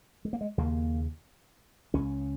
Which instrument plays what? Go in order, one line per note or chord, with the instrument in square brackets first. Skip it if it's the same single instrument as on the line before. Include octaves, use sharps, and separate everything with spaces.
[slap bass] G#3
A#3
G#3
D#2 C#3 A#3
C#2 C#3 C#4